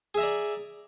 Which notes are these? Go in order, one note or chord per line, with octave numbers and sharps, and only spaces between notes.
G#4 D5 E5 A#5